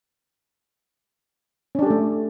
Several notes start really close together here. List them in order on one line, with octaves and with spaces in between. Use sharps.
C#4 D4 G4 A4 A3